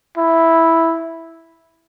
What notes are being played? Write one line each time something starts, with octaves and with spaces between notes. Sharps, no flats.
E4